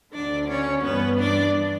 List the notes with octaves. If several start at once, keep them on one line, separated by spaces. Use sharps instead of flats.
D2 D3 D4 D5
C#4 C#5
G2 E3 B3 B4
D4 D5